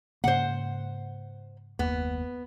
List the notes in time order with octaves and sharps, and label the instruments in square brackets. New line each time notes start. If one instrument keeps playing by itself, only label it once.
[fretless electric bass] G#2 C#3 A#3 [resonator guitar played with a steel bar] C5 F#5
[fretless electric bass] F#1 D#2 A#3 [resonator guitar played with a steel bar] B3